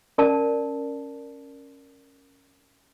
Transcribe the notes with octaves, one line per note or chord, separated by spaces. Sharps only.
C#4 A#4 D5 A5